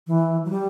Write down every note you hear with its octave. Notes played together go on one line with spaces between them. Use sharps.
E3
F#3
G3